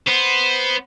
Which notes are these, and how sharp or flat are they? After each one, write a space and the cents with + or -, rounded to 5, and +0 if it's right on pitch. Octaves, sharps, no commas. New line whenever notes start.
B3 +0 C5 +0